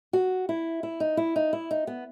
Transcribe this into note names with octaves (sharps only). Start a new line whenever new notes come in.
F#4
E4
E4
D#4
E4
D#4
E4
D#4
B3